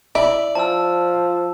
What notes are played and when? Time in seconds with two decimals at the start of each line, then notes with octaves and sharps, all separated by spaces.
0.15 E4 D5
0.55 F3 A5 E6